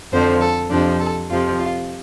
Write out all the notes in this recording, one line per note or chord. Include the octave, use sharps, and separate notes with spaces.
F2 D3 F3 C5
A4
F2 C3 F3 D4
A4
F2 C3 F3 F4
F4